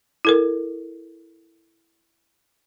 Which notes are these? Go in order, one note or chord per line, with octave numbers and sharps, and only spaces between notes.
E4 A4 A#4